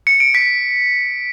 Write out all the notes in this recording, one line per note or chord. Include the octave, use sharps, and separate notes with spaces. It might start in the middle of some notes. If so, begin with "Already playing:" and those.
C#7
D7
B6 C#7